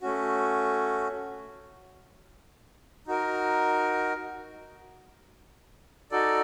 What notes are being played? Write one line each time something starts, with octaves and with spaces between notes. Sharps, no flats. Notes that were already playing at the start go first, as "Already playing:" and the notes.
A3 C#4 F#4
D#4 F#4 A#4
D#4 F#4 A4 D5